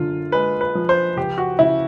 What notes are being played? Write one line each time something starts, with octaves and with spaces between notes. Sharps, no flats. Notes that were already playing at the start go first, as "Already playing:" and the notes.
Already playing: F#2 D3 F4
G#3 B4
B4
F3
C5
C#2 G4
F#4
C#3 E4